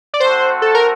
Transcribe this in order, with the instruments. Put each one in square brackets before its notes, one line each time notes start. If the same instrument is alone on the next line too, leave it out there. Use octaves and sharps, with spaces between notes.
[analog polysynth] D5
[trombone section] A3 C4 F#4 [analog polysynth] C5
[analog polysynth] A4
A#4